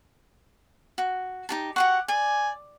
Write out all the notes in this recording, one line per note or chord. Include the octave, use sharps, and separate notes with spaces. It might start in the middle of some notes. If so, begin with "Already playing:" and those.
F#4
D#4 G4 A5
F#4 G4 F#5 C#6
D5 G#5